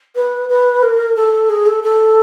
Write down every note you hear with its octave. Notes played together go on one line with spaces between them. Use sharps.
B4
B4
A#4
A4
G#4
A4
A4